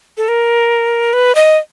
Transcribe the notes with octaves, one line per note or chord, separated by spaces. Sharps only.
A4
A#4
B4
D#5